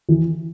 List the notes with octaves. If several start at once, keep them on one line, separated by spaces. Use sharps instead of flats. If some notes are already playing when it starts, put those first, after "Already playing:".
E3